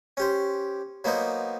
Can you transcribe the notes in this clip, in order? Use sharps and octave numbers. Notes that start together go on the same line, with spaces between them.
C#4 G4 C5
F#3 A#3 B3 D#4 C5